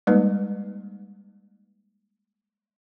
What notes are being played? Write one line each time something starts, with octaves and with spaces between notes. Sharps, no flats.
G3 G#3 A#3 D#4 B4